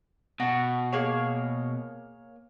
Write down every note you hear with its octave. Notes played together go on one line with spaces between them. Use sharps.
B2 F#4 A5
A#3 G#4 C#5